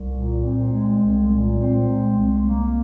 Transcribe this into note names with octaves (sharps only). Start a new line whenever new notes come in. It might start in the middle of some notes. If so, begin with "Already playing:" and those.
Already playing: C2
A#2
C4
G#3
C2
A#2
C4
G#3
C2
A#3